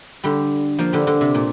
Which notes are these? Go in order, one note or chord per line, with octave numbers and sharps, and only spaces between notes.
D3 G3
F3 A#3
D3 G3
D3
C3
A#2